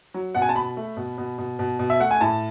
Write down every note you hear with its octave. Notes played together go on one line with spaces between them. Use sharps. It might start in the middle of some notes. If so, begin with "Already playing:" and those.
F#3
B2 F#5
G#5
A5
B2 B5
A3
B2
B2
B2
B2
B2
E5
A3 F#5
G#5
A2 A5